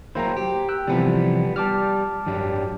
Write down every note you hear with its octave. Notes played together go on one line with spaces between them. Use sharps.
F#3 A#3 E4 C5 G5 A#5
G4
G5 E6 F#6
C3 E3 F3 G3 B3
G3 A5 D6 F6
G2 F#3 G3